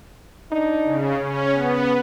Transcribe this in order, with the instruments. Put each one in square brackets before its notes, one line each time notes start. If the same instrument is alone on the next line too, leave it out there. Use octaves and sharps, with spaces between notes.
[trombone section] D4 D#4
[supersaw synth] C#3
[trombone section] C#3 [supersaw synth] C#4
[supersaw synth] B3